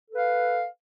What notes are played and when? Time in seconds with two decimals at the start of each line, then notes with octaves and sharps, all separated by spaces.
0.10 A4
0.13 B4
0.16 F5